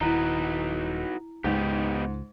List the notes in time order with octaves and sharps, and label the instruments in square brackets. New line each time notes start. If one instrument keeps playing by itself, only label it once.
[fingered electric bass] D#1 D#3 [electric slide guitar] D#4 F#4 B4 [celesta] E4 A#5
[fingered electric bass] C#2 [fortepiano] G#2 [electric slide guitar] B3 D#4 G4